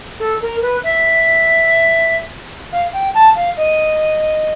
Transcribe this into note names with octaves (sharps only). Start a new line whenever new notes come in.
A4
A#4
B4
E5
F5
G5
A5
F5
D#5